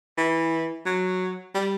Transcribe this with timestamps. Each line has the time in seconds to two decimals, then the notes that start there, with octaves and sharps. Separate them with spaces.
0.18 E3
0.86 F#3
1.54 G3